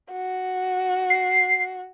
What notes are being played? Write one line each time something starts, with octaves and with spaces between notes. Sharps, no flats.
F#4
C7